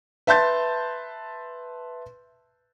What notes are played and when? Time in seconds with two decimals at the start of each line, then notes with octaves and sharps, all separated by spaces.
0.27 B4 E5 A5 C6 G6 A6